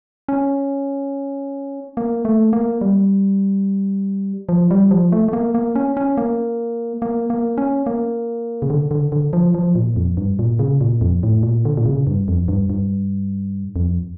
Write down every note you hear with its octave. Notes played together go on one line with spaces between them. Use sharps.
C#4
A#3
A3
A#3
G3
F3
G3
F3
A3
A3
A#3
A#3
C#4
C#4
A#3
A#3
A#3
C#4
A#3
C#3
D3
D3
D3
F3
F3
A#2
F2
G2
A#2
C#3
A#2
F2
A2
A#2
D3
A#2
C#3
G2
F2
G2
G2
F2